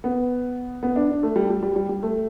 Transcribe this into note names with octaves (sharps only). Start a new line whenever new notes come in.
B3
B3
D4
D4
A3
G3
G3
G3
G3
G3
A3